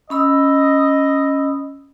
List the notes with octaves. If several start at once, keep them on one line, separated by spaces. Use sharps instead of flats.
C#4 D#5 B5 E6